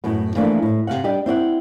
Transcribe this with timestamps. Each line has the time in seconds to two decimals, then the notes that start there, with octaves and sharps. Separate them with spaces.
0.04 F#2 A2 B3
0.36 E3 F3 A3 A#3 D4 F4
0.62 A2
0.87 C3 E3 F5 F#5
1.04 G3 D4 G4 D#5
1.26 C4 E4 D5 F#5